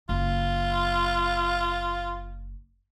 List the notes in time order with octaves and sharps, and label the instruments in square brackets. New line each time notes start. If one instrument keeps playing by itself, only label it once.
[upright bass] F#1 [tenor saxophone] F4